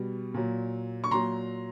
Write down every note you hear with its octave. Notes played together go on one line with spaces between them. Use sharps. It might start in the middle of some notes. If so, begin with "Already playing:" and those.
Already playing: B2 G3
A#2 F#3
C#6
A#2 F#3 A#5 C6